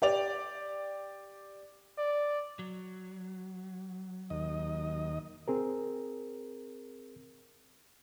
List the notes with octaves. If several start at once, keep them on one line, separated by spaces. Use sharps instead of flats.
G4 D5 F7
D5
F#3
D#2 D#5
C4 G#4 A#4